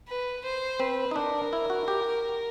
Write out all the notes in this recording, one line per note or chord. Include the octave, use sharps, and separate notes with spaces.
B4
C5
C4 B4
D#4
D4 A#4
E4
F#4
G4